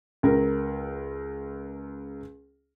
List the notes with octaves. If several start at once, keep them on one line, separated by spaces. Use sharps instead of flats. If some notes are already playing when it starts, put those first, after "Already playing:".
C#2 A#4